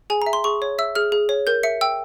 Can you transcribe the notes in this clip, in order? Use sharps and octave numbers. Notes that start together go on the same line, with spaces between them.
G#4 G#5
E5 A#5
C6
G#4 C#6
C#5
E5 E6
G#4 F6
G#4
C#5
A#4 G6
E5 C#7
G5 E6